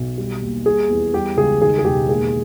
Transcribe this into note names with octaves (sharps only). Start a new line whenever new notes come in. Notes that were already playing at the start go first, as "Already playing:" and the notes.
Already playing: B1
G3
D#2
G3 G#4
E2
G3 G4
C#2 G#4
D#3 G#4
G#4
E1 G4
A#3 G#4